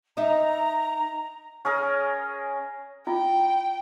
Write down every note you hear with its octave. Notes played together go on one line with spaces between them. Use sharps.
D#4 D#5 E5 A#5
C#4 G#4 A#4 D#5
E4 F4 G5